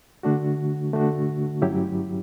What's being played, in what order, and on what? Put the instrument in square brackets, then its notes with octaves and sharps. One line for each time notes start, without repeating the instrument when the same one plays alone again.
[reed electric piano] D3 A3 D4 F#4
D3 A3 D4 F#4
G2 F#3 C#4 E4 G4